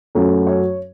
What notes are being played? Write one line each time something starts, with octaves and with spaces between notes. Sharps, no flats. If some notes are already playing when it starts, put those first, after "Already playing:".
F#2 F#3 A3
C#5